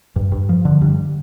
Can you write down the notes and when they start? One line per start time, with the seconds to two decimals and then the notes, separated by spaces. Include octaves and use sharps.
0.16 G2
0.32 G2
0.49 F3
0.65 D3
0.81 G2